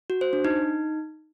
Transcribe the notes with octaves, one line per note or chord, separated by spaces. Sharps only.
F#4
C5
D4
D#4